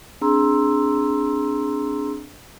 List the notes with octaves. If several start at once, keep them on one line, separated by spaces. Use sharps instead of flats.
C4 D4 G#4 A#5 C6 E6